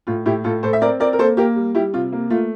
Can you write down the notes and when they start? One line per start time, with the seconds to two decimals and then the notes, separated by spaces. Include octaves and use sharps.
0.07 A2 F4
0.26 A2 E4 G4
0.44 A2 F4 A4
0.63 A2 A4 C5
0.73 E5
0.81 C4 A#4 D5
1.00 C4 A#4 D5
1.13 A#4
1.19 A#3 A4 C5
1.37 A#3 G4 A#4
1.56 G3
1.75 G3 E4 G4
1.93 C3 F4
2.12 A#3
2.30 A3 F4